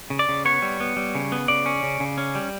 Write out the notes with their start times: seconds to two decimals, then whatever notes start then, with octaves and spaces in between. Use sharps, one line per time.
0.10 C#3
0.19 D5
0.29 C#3
0.45 B3 C#5
0.62 G3
0.80 B3
0.97 G3
1.15 C#3
1.32 B3
1.48 C#3 D5
1.66 C#4
1.83 C#3
2.00 C#3
2.18 C#4
2.35 G3